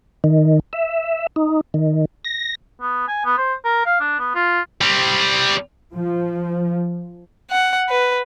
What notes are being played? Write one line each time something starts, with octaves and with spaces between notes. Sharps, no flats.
D#3
E5
D#4
D#3
A#6
B3
G#5
B3
C5
A#4
F5
D4
B3
F4
G3 C4
F3
F#5
B4